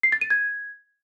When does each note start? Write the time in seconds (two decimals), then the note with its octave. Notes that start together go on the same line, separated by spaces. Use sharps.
0.03 C7
0.12 A6
0.21 D#7
0.30 G#6